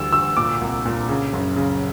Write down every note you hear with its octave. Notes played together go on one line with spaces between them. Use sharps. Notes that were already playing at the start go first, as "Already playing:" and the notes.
Already playing: D2 E3 G3 E6
D2 E6
A#2 D6
C2
A#2
C#3
F#1
C#3